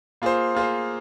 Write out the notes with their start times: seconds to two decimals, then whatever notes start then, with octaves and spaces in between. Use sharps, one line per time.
0.22 A#3 F4 G#4 C5
0.55 A#3 F4 G#4 C5